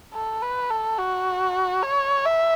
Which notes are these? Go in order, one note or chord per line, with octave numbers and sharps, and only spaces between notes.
A4
B4
A4
F#4
C#5
E5